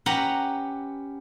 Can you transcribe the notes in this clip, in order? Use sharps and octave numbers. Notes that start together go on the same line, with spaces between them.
C#4 G4 B4 F#5 A#5